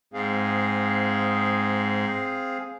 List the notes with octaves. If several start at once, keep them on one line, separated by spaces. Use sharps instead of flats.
G#2 C4 G#4 F5